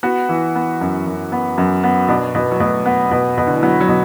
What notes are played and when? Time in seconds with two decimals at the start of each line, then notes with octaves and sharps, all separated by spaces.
0.03 B3 F#4
0.29 E3
0.56 B3
0.81 F#2
1.07 F#2
1.32 B3
1.58 F#2
1.84 B3
2.09 B2 D4
2.34 B2 B3
2.51 F#3
2.60 B2 A3
2.86 B3
3.11 B2
3.38 B2
3.47 D3
3.55 E3
3.63 F#3 B3
3.80 F#3
3.88 B2